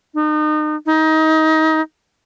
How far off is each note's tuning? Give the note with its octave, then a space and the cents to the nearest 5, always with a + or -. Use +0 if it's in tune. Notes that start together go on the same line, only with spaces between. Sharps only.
D#4 -35
D#4 +25